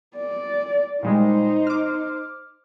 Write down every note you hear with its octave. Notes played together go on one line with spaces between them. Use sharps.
D5
A#2 G3 G#3 D#4 C5
D6 F6